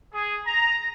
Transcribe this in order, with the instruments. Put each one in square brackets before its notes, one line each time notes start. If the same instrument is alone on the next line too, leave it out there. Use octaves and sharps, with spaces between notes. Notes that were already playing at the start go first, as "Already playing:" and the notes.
[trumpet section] G#4
A#5